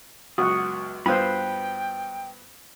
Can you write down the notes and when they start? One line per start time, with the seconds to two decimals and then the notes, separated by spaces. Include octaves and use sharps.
0.38 C#2 F#2 F#4 D#6
1.06 G2 B3 F4 C5 G5 B5 F#6